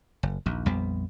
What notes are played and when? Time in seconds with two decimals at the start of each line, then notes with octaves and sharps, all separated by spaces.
0.23 F#1
0.46 A#1 D#2
0.66 A#1 F2 G3 B3